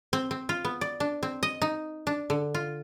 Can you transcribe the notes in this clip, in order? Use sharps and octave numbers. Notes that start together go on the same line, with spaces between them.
C4
C4
F4
B3
D5
D4
C4
D#5
D#4
D4
D3
F4